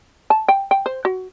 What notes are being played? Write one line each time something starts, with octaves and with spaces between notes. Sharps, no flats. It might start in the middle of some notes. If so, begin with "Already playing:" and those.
A5
G5
G5
C5
F#4